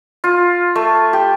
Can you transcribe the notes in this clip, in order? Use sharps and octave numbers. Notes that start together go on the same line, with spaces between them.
F4
A3
G4